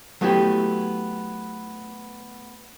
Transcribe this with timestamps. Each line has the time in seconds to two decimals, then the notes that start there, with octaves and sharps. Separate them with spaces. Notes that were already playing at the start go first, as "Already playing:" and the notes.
0.21 F#3 A3 B3 E4 G4